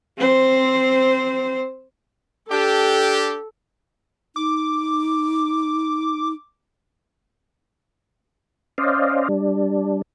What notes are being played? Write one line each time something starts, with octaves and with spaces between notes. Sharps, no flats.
C4 C5
D4 G4 A4
D#4 D6
C#4 C5 D5 D#5 F5
G3 D4